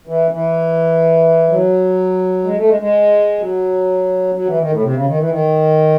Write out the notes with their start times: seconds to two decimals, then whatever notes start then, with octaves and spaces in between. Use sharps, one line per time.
0.07 E3
0.31 E3
1.49 F#3
2.44 G#3
2.57 A3
2.68 G#3
2.80 G#3
3.39 F#3
4.35 F#3
4.47 E3
4.59 D#3
4.70 A2
4.82 C3
4.93 C#3
5.06 D#3
5.18 E3
5.29 D#3